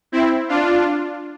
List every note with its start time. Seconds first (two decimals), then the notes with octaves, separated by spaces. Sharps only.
0.12 C4 E4
0.49 D4 F4